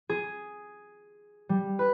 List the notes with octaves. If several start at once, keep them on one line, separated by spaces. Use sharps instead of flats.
G#4
G3
B4